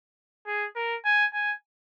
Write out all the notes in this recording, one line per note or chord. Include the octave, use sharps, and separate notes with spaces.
G#4
A#4
G#5
G#5